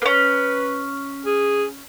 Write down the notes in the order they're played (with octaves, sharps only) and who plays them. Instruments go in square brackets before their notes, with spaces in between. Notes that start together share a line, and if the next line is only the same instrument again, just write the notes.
[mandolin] A#3 C#4 [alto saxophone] B4
[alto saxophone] G#4